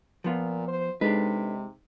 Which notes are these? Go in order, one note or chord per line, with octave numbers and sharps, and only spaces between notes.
A#2 F3 B3 F4
C5
C3 G#3 D4 D#4 A4 B4